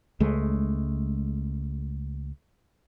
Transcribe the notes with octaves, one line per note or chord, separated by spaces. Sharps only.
C#2 G#3 A3